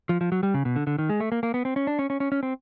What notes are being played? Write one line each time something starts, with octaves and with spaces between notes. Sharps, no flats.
F3
F3
F#3
G3
C#3
B2
D3
D3
D#3
G#3
A3
A#3
A#3
B3
C4
C#4
D4
C#4
C#4
C#4
C#4
C4